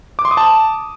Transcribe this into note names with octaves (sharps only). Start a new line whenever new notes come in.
D6
C6
D#6
A5